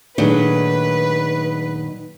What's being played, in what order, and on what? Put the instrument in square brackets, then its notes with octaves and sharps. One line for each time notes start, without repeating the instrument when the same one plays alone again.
[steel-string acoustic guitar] A#2 D#3 F#3 [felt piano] A3 D4 G#4 [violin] B4